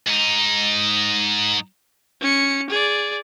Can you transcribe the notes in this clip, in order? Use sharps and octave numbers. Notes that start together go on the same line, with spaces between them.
G#2 D#4
C#4 C#7
G#4 D5